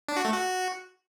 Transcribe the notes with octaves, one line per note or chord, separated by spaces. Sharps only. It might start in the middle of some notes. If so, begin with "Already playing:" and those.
D4
F#4
A3
F#4